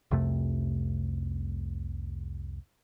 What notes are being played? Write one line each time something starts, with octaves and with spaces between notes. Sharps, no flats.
C2 F2 C3 A3